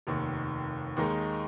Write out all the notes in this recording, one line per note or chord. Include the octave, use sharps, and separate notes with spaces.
F1 D#2 D#3
D#2 D#3 G#3 D#4 A#4